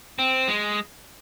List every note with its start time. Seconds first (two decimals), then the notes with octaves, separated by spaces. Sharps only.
0.19 C4
0.48 G#3